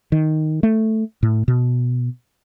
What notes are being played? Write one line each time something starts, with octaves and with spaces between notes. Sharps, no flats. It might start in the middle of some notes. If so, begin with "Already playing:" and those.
D#3
A3
A2
B2